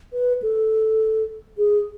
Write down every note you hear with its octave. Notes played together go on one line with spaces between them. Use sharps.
B4
A4
G#4